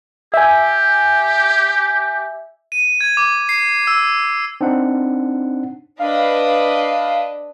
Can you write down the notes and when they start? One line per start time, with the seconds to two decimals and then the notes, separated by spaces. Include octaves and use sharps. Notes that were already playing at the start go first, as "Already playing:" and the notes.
0.34 G4 E5 G#5
2.72 D#7
3.01 G#6
3.17 D6
3.49 C7
3.87 E6
4.61 C4 D4 D#4 F#5
5.99 D4 B4 D#5 F5